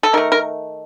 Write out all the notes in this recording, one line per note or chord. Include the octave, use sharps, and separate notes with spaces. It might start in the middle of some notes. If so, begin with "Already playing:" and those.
A4
D#3 A3 A#4
A#4